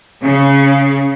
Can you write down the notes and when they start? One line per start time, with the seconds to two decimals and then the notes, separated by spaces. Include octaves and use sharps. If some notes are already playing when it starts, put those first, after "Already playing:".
0.23 C#3